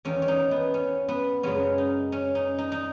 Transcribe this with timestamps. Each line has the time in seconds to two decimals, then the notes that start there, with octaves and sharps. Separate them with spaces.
0.05 E2 D#3 A#3 C#4
0.22 C#4
0.28 D#4
0.51 B3
0.74 C#4
1.08 B3
1.43 F#2 C#3 G#3 B3 C#4
1.78 D#4
2.12 C#4
2.35 D#4
2.58 D#4
2.72 D#4